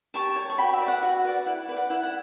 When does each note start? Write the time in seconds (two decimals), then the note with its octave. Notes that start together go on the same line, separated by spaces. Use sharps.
0.14 G4 A5 C#6
0.36 C#5
0.50 C#6
0.58 F#4 G5 B5
0.74 E5
0.80 B4 D5
0.88 F#5
1.03 F#4 F#5
1.25 B4 D5
1.32 F#5
1.46 E4 F#5
1.69 B4 D5
1.77 F#5
1.90 E4 F#5
2.03 F#5